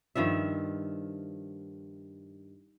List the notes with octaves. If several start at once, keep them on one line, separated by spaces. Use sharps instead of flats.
G2 D#3 F3 E5